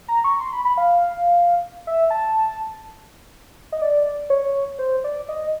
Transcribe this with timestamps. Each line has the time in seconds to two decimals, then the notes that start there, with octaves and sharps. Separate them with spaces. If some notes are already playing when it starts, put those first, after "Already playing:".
0.08 A#5
0.24 C#6
0.40 C6
0.53 B5
0.65 B5
0.78 F5
1.87 E5
2.10 A5
3.72 D#5
3.82 D5
4.30 C#5
4.79 C5
5.04 D5
5.29 D#5